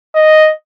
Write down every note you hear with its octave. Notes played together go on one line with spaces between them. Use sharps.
D#5